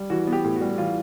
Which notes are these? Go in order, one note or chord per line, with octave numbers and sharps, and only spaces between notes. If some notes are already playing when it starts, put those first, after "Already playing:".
Already playing: G3
E3 F#4
B3
G4
A2
F#4
G3
E3 F4